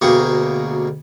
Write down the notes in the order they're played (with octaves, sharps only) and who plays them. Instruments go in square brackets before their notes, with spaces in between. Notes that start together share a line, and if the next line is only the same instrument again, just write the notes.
[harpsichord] D2 B2 A#3 G4 G#4 C#6